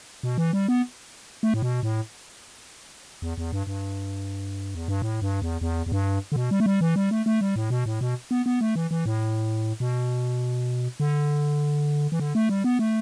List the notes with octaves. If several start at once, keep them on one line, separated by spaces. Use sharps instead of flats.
B2
E3
G3
B3
A3
A2
B2
A2
E2
E2
G2
G2
E2
G2
A2
G2
E2
E2
E2
G2
D3
B2
G3
A3
G3
E3
G3
A3
A3
G3
A2
B2
A2
B2
B3
B3
A3
E3
E3
A2
B2
D3
E3
D3
A3
G3
B3
A3